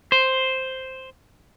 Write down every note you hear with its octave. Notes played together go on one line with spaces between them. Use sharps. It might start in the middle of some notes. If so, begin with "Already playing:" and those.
C5